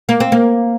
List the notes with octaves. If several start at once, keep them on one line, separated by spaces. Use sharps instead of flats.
A#3
C4
A#3